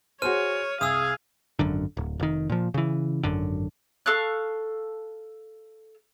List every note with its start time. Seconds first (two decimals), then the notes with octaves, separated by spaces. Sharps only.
0.22 F#4 G#4 C5 C#5 F6 D#7
0.81 C2 G#4 F5 G#5 D#6 E6
1.59 G#1 F#2 D3
1.97 D1
2.20 F1 D#3
2.50 A#2 F3
2.74 C#3 E3
3.23 G#1 F#2 D3
4.06 A4 F5 C#6 F#6